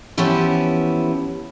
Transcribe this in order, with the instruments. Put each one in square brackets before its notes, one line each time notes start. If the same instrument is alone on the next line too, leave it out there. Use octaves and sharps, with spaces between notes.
[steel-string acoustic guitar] E3 F3 B3 C#4 E4 G4